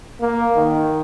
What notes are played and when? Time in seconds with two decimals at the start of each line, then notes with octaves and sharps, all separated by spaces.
0.21 A#3
0.56 D#3